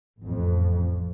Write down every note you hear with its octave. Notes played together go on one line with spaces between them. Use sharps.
A1 F2